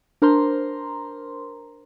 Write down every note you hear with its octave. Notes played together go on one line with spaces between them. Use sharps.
D4 A#4 C5 A#5 C6